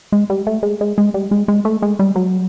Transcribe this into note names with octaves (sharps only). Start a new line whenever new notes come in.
G#3
G3
A3
G#3
G#3
G#3
G3
G#3
G#3
A3
G#3
G3
F#3